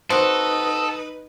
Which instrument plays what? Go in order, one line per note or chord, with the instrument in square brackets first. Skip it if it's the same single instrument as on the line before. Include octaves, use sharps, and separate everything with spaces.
[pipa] C4 F#4 [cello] D#4 B4 [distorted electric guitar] A4 [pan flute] D#6